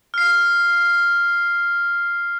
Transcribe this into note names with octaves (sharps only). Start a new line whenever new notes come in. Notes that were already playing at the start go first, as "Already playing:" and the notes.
F6 C7